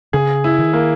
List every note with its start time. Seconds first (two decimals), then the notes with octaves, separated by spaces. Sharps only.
0.13 C#3 G#4
0.44 E4
0.59 D#3
0.73 A#3